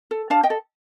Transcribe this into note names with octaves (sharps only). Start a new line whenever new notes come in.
A4
D4 F5 A5
D#5 G5
A4